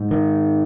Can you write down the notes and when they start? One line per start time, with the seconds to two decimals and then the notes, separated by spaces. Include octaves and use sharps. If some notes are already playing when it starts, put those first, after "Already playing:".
Already playing: G#2
0.11 D#3